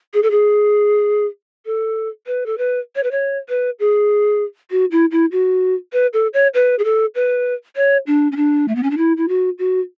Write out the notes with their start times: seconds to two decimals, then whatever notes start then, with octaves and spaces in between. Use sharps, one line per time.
0.14 G#4
0.23 A4
0.31 G#4
1.66 A4
2.27 B4
2.46 A4
2.58 B4
2.96 C#5
3.03 B4
3.11 C#5
3.49 B4
3.80 G#4
4.71 F#4
4.91 E4
5.11 E4
5.32 F#4
5.93 B4
6.13 A4
6.34 C#5
6.54 B4
6.79 G#4
6.84 A4
7.15 B4
7.76 C#5
8.07 D4
8.32 C#4
8.36 D4
8.68 A3
8.75 B3
8.83 C#4
8.91 D4
8.97 E4
9.17 E4
9.28 F#4
9.59 F#4